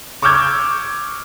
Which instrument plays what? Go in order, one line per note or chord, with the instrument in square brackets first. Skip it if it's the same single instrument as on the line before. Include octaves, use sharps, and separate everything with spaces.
[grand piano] C#6 D6 E6 F6 G6 G#6